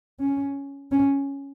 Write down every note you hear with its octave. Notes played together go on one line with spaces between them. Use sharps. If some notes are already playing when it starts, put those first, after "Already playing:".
C#4
C#4